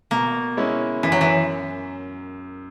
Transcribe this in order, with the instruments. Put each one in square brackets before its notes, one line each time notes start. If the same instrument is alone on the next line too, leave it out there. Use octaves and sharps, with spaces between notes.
[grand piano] B2 [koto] A#3
[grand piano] G#3 C#4 E4
[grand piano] F#2 [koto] E3
[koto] F#3
E3